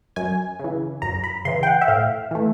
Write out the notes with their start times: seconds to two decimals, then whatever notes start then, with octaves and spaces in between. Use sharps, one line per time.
0.16 F#2 G#5
0.59 C#3 E3
1.02 F#2 A#5
1.24 B5
1.45 C#3 E3 C6
1.63 G5
1.67 F#5
1.81 E5
1.88 A2 F5
2.31 E3 A3